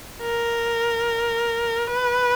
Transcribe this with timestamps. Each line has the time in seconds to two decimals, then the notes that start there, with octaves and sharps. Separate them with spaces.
0.22 A#4
1.87 B4